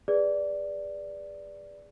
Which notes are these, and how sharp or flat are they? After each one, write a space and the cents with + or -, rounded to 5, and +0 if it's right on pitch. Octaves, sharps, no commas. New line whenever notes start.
G#4 -20 B4 +0 D5 +0